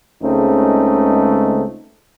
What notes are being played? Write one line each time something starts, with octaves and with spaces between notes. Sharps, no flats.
C#2 C#3 G#3 A3 C4 D#4